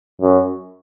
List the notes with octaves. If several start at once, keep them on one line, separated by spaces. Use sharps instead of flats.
F#2